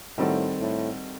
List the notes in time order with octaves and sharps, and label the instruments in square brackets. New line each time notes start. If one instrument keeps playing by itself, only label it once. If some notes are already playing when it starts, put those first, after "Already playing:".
[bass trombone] A2 [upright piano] D#3 G3 C4 F#4 A4
[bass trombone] A2